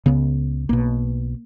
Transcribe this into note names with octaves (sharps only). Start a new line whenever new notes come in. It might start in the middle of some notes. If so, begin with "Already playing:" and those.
C#2 C#3 B3
B1 B2 A#3